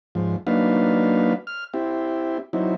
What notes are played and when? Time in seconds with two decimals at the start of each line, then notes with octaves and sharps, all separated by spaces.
0.15 G#2 F3
0.47 F#3 A#3 D4 D#4 B4 F5
1.47 F6
1.74 C4 E4 G4
2.53 F#3 C4 D#4 E4